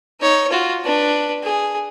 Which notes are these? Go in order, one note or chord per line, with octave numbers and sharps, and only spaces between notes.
D#4 C#5
F4 F#4
D4 B4
G#4